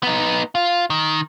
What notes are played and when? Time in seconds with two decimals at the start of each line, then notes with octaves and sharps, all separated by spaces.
0.03 B3 D#4
0.55 F4
0.90 D#3